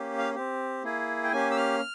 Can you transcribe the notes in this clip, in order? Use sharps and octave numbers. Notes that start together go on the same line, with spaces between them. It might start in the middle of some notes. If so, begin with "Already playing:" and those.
Already playing: A#3 C#4 G4
F5
C4 G4
A#3 E4 G#4
G5
A#3 C#4 G4 G#5
E6
F6